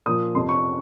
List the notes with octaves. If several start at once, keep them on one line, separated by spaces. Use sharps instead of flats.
A#2 F3 D#6
F2 C3 F3 C6
C#6